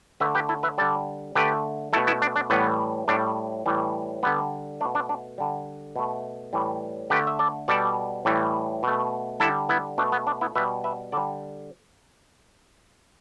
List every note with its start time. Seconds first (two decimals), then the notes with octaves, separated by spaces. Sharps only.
0.20 D3 A3 B4 E5
0.35 G4 B4
0.49 E4 A4
0.63 B4 E5
0.78 D3 G3 A4 D5
1.35 D3 A3 G4 B4
1.93 A3 E4 A4
1.96 B2
2.07 B3 E4
2.22 D4
2.36 D4
2.50 A2 E3 G3 B3
3.08 A2 G3 D4
3.66 A2 E3 G3
4.23 D3 G3 B3
4.80 A3 D4
4.85 B2
4.95 D4
5.09 D4
5.38 D3 G3
5.96 B2 A3
6.53 A2 E3 G3
7.10 D3 A3 G4 B4
7.27 E5
7.39 A4 D5
7.68 B2 G3 A4 D5
8.25 A2 E3 G3
8.83 B2 A3
9.40 D3 G3 E4 A4
9.69 B3 E4
9.98 B2 A3 D4
10.12 B3
10.27 D4
10.41 B3 E4
10.55 B2 G3 B4 E5
10.84 B4 E5
11.12 D3 A4 D5
11.17 G3